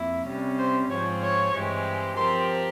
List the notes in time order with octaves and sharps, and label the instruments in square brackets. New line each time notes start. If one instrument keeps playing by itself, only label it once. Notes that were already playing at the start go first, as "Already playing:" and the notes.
Already playing: [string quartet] F2 A#3 E4
C3 G3 C#4
[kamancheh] C5
[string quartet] G#2 F3 C4 F4 G#4 [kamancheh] C#5
[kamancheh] C#5
[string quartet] G2 E3 G#3 C4 G4
[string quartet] F3 C4 G4 A#4 [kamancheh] C6